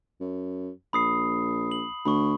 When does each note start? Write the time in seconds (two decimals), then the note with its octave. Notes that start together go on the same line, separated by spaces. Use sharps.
0.20 F#2
0.93 A#1 B5 D#6 C7
1.72 F#7
2.05 D2 B5 C#6